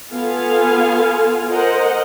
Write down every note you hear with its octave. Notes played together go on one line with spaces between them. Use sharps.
B3 F4 A4 F5 G#5
A#4 C5 D#5 F#5